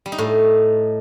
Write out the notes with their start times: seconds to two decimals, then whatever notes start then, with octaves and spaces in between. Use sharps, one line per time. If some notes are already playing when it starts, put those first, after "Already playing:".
0.06 G3
0.12 D#4
0.18 A2